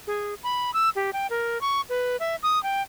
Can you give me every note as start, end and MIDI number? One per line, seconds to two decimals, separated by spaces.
0.07 0.34 68
0.43 0.71 83
0.74 0.90 88
0.96 1.11 67
1.13 1.27 79
1.30 1.60 70
1.61 1.81 85
1.90 2.17 71
2.20 2.36 76
2.43 2.62 87
2.63 2.82 79